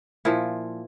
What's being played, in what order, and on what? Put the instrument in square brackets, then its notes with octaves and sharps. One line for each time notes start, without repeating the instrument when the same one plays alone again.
[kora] A#2 F3 E4